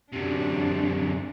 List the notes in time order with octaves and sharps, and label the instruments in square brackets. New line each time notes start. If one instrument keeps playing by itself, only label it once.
[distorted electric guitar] F#2 C3 [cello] D4